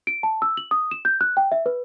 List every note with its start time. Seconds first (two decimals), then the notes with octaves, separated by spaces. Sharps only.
0.07 D7
0.23 A5
0.42 E6
0.57 F#7
0.71 D#6
0.91 E7
1.05 G6
1.21 F#6
1.37 G5
1.52 E5
1.66 B4